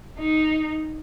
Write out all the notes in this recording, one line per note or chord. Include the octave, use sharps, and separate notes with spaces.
D#4